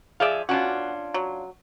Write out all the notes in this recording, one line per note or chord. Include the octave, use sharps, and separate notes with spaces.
F3 G#4 D5 E5 F5
B2 C#4 D4 F4 F#4
F#3